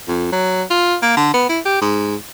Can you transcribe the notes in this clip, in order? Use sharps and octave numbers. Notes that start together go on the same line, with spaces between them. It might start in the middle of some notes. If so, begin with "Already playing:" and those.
F2
F#3
F4
A#3
D3
B3
E4
G4
G#2